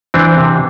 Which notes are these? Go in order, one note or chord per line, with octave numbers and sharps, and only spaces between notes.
E3 C4 D4
C3